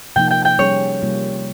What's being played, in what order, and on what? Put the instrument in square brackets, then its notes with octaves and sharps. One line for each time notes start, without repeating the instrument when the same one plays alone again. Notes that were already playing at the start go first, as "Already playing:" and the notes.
[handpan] C3 F3 A#3 D#4 [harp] G5
[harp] G5
G5
[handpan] G3 C#4 G#4 [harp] C#5
[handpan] C3 G3 A#3 F4